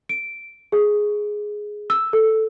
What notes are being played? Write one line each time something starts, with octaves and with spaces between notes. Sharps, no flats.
D7
G#4
E6
A4